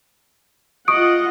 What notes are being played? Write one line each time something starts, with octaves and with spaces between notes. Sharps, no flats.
F4 D#5 F#5 C#6 D#6 D7